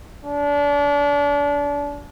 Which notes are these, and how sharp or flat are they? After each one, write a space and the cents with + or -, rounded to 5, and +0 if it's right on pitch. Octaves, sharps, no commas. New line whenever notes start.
D4 -30